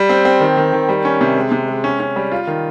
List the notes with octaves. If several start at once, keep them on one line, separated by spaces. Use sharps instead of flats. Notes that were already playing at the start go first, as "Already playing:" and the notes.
Already playing: G3
C4
C4
D#3
D#3
D#3
G3
C#4
C3
G#3
C3
G#3
C#4
C#4
G3
F4
D#3